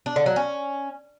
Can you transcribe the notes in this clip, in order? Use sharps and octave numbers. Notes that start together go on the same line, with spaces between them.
D4
D3
F#3
C#4